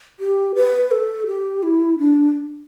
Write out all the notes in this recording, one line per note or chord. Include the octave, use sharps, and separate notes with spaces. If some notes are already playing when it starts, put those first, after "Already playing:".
G4
B4
A4
G4
E4
D4